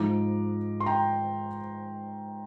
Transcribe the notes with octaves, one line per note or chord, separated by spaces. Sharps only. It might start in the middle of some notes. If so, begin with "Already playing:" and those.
Already playing: G#2 F3 G#3 D#4 A#5 D6
C6
G5 A#5